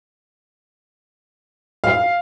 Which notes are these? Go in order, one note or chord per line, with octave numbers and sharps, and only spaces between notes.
F5